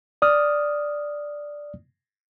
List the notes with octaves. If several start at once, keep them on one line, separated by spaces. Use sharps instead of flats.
D5 D#6 F6